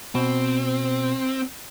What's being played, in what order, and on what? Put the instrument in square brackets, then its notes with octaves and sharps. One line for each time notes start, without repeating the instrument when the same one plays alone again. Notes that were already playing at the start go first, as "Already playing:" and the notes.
[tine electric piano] B2 [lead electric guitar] C4